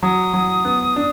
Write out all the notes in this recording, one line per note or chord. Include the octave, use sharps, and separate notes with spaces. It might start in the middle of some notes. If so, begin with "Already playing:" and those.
F#3 D#6
F#3
B3
D4